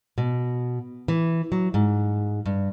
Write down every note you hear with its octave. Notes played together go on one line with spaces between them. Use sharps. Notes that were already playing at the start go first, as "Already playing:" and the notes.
B2
E3
F#3
G#2
G2